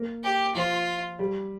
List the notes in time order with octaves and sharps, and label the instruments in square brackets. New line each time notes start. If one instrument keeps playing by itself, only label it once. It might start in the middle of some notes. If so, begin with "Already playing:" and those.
Already playing: [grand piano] A#3
[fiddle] G4
[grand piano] F3 [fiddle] F4
[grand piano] G3